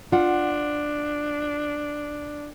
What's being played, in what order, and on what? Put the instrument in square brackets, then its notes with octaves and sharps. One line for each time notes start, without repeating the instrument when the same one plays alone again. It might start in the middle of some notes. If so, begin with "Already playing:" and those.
[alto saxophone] D4 [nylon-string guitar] F4 F#5